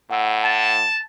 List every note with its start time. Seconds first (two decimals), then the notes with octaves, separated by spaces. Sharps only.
0.11 A2 F#5 E6
0.45 A5